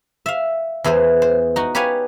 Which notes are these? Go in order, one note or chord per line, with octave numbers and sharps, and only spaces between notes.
E5 F5
E2 E3 G#4 C5
C5
D#4 F#4
G4 B4 C#5 F5 G#5